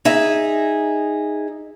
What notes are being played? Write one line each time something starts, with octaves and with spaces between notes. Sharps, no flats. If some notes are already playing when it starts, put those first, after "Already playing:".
D#4 G#4 E5